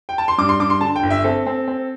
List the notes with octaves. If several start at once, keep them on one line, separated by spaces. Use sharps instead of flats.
G5
A5
C6
G2 D6
C6
G2 D6
C6
D3 A5
G5
G1
E5
C4 A4
C4
C4